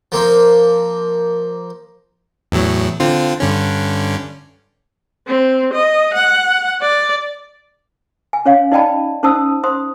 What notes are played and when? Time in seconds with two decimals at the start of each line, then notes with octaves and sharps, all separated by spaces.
0.12 F3 A#3 C4
2.52 E2 A2 F#3
3.00 D3 C4 F4
3.40 G2 D3 C#4
5.27 C4
5.73 D#5
6.14 F#5
6.81 D5
8.33 G#5
8.45 C#4 C#5 F5
8.72 D#4 D5 D#5 G5 A5 B5
9.23 C#4 D#4 C5 A5 D#6 E6
9.64 C5 C6 D#6